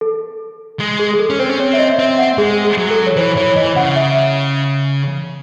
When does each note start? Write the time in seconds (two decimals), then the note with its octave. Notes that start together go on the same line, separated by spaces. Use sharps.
0.01 A4
0.80 G#3
0.99 G#4
1.14 G#4
1.19 A4
1.30 C#4
1.39 C4 C5
1.49 C#4
1.60 C4 C#5
1.73 E5
1.79 D#5
1.99 C4 E5
2.18 F#5
2.38 G#3 G#4
2.65 G#4
2.78 F#3
2.91 A4
3.07 C#5
3.16 E3 C5
3.36 E3 C#5
3.56 E3 D#5
3.76 C#3 F#5
3.96 E5